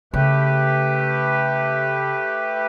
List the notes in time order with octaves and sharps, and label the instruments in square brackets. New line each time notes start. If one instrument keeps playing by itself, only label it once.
[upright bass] C#3 [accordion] A3 G4 B4